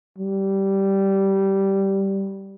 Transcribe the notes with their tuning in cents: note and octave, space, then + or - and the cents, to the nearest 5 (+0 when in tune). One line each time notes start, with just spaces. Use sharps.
G3 -10